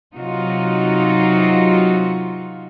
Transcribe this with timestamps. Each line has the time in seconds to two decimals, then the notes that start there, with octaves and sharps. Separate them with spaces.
0.15 C3 F#3 D#4 F4 F#4